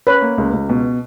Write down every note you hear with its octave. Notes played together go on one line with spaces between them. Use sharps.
C#4 B4
A#3
C#2
C#2
B2